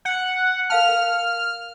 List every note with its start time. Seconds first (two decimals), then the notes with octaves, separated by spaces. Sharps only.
0.05 F#5
0.70 A#4 F5 A5 F6
0.89 A#4